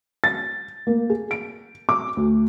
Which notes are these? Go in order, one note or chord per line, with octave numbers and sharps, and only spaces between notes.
A6
A#3
G#4
D7
D6
D2